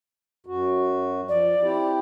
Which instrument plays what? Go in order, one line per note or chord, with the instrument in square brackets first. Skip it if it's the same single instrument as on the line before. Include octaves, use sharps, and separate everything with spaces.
[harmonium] F#2 F#4
[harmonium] F3 [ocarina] D5
[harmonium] C4 E4 G4